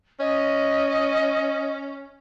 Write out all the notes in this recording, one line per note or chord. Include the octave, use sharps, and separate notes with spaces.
C#4 D#5